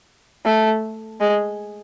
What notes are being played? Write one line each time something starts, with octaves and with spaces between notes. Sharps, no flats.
A3
G#3